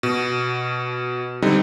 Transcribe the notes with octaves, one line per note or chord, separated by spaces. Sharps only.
B2
D3 G3 C4 D#4